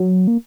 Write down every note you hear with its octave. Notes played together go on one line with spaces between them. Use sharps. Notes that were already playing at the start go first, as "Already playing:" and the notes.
Already playing: F#3
A#3